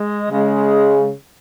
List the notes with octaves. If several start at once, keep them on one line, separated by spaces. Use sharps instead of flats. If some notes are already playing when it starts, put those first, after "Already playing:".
Already playing: G#3
C#3 G#3